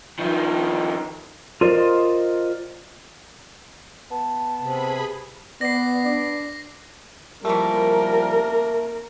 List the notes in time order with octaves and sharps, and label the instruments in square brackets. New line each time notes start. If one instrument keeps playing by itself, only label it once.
[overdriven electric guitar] D#3 F3
[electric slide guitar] F4 A#4 C5 D5 D#5
[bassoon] B3 [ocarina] A5
[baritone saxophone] C3 [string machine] G#4 B5
[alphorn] B3 [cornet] D5 [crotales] A#6 C7
[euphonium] D4 [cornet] D5
[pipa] E3 A3 [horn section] F3 G3 [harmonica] A#3 [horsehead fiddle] A#4